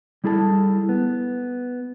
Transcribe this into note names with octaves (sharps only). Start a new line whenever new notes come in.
G3 E4 G#4 A4 A5
B3